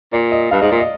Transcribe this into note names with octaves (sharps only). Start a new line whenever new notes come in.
A#2 D5
D#5
G2 F5
G#2 D#5
A#2 D5
D#5